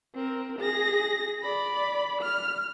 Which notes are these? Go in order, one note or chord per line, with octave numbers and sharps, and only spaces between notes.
C4 A#4
G#4 A#6
D5 B5
F6